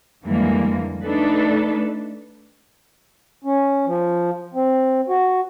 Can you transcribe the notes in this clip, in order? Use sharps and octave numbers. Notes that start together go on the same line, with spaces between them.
F2 D3 E3 G3 G#3 A#3
A3 D4 D#4 A4 B4
C#4
F3
C4
F#4